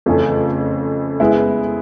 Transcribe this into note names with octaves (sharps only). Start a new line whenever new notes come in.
F2 C#3 E3 A3 C#4
G#3 B3 E4